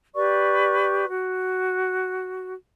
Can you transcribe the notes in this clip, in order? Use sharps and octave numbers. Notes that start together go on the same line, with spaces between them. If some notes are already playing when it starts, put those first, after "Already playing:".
G4 B4 D5 C#6
F#4